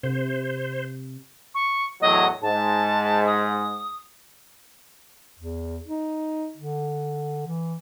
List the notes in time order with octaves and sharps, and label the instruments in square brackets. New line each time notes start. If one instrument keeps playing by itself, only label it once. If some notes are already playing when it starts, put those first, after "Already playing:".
[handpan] C3 [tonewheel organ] C5
[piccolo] C#6
[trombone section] E2 A2 F#3 [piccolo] D#5
[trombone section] G#2 [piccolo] A5
[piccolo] D#6
[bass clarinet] E2
D#4
D3
E3